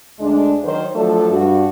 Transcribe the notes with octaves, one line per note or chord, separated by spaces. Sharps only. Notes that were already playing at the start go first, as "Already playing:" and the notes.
D2 G#3 D4
D#3 F#3 C5
F3 F#3 A3 D4 A4
G2 F#4